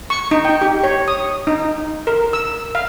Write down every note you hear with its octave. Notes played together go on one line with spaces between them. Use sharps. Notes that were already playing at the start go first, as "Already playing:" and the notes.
C#6
D#4
G5
G4
C#5
D#6
D#4
A#4
E6
F5